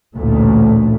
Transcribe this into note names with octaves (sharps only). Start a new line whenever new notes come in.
A1 D2 A#2 A3